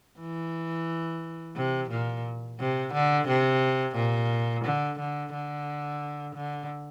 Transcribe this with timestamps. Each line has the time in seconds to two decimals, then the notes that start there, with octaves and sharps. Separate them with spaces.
0.19 E3
1.56 C3
1.90 A#2
2.59 C3
2.94 D3
3.28 C3
3.95 A#2
4.64 D3
4.99 D3
5.33 D3
6.35 D3